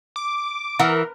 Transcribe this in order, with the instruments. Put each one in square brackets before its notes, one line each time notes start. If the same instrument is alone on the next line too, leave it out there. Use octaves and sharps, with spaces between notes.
[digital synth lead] D6
[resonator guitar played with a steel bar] E3 [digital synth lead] A#4 [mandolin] F#5 D#6 E6